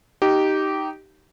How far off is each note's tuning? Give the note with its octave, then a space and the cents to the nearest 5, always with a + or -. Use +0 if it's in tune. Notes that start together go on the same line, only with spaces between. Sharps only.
D#4 +0 G4 -15